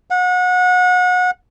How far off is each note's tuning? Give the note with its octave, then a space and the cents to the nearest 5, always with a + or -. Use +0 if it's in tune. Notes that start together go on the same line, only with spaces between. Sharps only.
F#5 -30